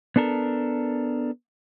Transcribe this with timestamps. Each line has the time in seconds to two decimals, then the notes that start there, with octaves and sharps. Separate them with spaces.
0.16 B3 D4 A4 A#4